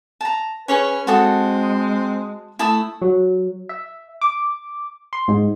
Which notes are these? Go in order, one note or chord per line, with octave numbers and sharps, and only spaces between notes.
A5 A#5
C#4 G#4 B4 C#5 C#6
G#3 C4 F#4 A4 D#6
A3 E4 A5 D#6
F#3
E5
D6
C6
G#2